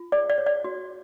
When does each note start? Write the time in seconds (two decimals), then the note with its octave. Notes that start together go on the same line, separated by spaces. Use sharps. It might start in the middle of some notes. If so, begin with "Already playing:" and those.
Already playing: F4
0.12 G#4 D5
0.30 D5
0.38 C#5
0.46 D5
0.64 F#4